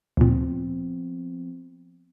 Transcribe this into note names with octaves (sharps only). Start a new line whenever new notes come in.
D2 A#2 F3 B3 C4